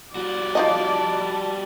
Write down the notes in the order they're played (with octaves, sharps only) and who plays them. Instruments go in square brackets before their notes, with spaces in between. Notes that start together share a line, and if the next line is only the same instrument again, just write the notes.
[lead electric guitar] G3 F#4 [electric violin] D5
[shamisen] D#4 F4 D#5 [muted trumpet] A5